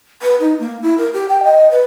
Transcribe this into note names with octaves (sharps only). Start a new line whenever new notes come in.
B4
D#4
A#3
E4
A#4
G4
G5
D#5
B4